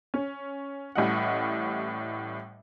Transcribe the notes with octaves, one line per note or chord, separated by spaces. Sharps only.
C#4
A1 A2 G3 D#5 F#5